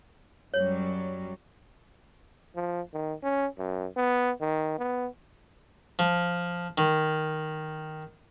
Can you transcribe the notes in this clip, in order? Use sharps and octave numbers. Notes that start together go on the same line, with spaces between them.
F#2 F#3 G3 C#5
F3
D#3
C#4
F#2
B3
D#3
B3
F3
D#3